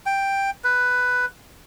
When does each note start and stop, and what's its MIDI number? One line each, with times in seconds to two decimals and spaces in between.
0.06 0.50 79
0.64 1.26 71